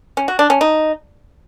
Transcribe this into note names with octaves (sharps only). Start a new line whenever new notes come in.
C#4
F#4
D4
C#4
D#4